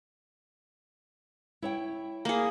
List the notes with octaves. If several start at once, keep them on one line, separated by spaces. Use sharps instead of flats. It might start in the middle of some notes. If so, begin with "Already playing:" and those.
E4 C#5 G5
A#3 G#4